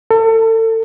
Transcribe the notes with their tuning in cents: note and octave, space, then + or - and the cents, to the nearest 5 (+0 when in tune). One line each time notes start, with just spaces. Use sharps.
A4 +35